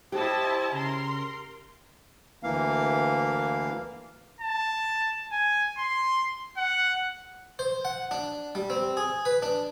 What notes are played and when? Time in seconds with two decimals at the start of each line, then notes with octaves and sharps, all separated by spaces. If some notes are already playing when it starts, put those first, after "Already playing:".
0.12 E4 G4 C5 D#5 A5
0.72 C#3 A#4 C6
2.43 D2 E3 A#3 F5
4.41 A5
5.32 G#5
5.78 C6
6.57 F#5
7.59 C5
7.85 F#5
8.11 D4
8.55 G3
8.70 C4
8.97 G#4
9.25 B4
9.42 D4